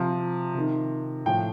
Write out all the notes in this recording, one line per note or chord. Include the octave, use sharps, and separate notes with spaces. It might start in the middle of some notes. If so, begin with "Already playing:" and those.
Already playing: C3 F3
C3 D#3
A2 F3 G5